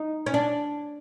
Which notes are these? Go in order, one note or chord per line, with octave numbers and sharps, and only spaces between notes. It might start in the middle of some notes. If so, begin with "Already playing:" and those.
Already playing: D#4
C#4
D4